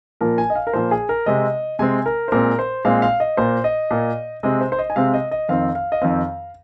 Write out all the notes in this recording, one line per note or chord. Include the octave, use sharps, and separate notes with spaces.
A#2 F3 A#3 A#4
G#5
D#5
F5
A#4
A#2 F3 A#3 C5
G#4
A#4
C3 G#3 C4 D#5
C3 G#3 C4 G#5
A#4
C5
A#2 G#3 C4 A#4
C5
A#2 G#3 C4 F5
F5
D#5
A#2 A#3 C5
D#5
A#2 A#3
C3 G#3 C4 D#5
C5
C5
D#5
G#5
C3 G#3 C4 F5
D#5
D#5
F2 D#3 C4 F5
F5
D#5
F2 D#3 C4 F5